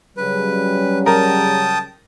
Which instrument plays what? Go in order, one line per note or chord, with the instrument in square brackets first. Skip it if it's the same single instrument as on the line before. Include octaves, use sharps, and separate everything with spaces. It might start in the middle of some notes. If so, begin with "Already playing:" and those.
[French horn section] C#3 F#3 G3 [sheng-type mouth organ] B4
[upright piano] A#4 [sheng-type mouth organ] G5 A5 D#6